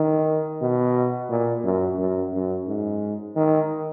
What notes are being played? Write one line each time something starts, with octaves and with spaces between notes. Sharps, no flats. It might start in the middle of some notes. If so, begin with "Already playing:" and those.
Already playing: D#3
B2
A#2
F#2
F#2
F#2
G#2
D#3